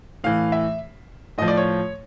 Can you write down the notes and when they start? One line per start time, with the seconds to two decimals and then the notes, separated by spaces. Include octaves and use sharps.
0.24 A2 E3 F5
0.52 E5
1.38 A2 F3 D#5
1.48 D5
1.57 C#5